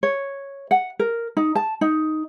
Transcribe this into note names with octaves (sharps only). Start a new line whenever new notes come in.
C#5
F#5
A#4
D#4
A5
D#4